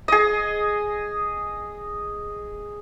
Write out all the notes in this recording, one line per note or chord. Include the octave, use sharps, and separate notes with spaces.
G#4 D#5